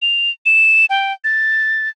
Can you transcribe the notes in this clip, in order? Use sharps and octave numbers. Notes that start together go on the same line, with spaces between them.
F7
E7
G5
A6